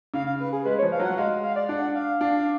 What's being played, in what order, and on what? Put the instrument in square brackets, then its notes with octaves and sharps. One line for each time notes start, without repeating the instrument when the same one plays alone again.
[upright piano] C#3 [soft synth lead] F5
[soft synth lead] F5
B4
G#4
[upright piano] G#3 [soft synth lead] B4
[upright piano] F3 [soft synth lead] C#5
[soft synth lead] F5
[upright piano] F#3
[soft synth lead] F#5
[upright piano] G#3 [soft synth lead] F5
[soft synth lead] F5
D5
[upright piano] D4 [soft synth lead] F#5
[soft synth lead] F5
[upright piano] D4